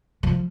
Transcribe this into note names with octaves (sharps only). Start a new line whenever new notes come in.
F3